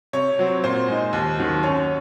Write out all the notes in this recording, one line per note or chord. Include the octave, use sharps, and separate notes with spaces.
C3 C#5
F#3 C4
A#2 C5
G#3 D#4
D#2
D#3 F#3
F#2 C#5